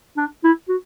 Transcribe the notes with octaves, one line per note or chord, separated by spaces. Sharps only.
D4
E4
F#4